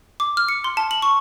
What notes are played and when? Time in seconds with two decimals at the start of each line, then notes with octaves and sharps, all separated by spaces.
0.20 D6
0.37 F6
0.49 C#7
0.64 C6
0.77 A5
0.91 F#7
1.02 C#6